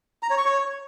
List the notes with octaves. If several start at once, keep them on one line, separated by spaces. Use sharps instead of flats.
A#5
C#5
C#6
C#5